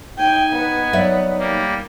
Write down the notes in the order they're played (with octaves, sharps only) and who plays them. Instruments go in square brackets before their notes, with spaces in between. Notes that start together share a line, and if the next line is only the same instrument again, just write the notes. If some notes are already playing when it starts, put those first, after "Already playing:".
[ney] D#4 [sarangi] G5 [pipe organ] G#5
[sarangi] B3
[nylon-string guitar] F#3 D5 E5
[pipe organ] G3 A#3